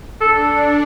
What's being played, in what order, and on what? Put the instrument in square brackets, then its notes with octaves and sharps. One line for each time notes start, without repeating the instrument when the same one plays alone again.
[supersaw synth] D4 [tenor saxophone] A4